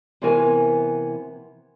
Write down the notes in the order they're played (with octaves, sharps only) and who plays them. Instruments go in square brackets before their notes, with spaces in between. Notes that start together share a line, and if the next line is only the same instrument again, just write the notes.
[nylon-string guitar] C3 E3 B3 F#4 A#4 G#5